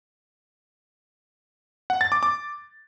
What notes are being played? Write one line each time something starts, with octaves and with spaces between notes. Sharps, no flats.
F#5
A6
D6
D6